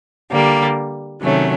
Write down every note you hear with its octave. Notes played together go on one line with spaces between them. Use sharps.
D3 G3 A#3
C3 D#3 F#3 A3 C#4